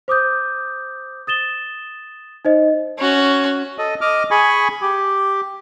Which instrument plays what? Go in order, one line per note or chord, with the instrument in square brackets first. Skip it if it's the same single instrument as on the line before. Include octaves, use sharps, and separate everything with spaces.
[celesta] C5 D6 D#6 G6
D#6 A6 E7 G7
D#4 C5 D#5
[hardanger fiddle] C#4 F#4
[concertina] A4 D#5
D#5 D6 F6
G#4 G#5 B5 C#6
G4